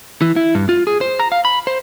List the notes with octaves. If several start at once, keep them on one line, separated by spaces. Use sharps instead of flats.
E3
E4
G2
F4
G#4
C5
A#5
F5
B5
C5